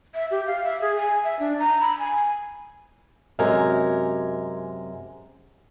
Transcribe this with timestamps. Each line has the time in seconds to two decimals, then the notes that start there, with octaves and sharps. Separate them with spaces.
0.15 E5
0.31 G4
0.47 F5
0.64 E5
0.81 G#4
0.97 G#5
1.24 E5
1.39 D4
1.59 A#5
1.80 B5
1.99 G#5
3.39 F#2 C3 G#3 A#4 G#5